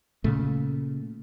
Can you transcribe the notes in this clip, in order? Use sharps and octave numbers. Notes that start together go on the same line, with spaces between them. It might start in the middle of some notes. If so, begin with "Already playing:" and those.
A#2 C#3 A3